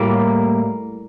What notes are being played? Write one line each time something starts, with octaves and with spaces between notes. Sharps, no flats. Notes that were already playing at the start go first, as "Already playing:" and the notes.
Already playing: A2 G3 A#3